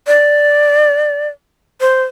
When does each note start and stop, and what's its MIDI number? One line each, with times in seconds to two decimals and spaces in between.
0.07 1.28 74
1.81 2.03 72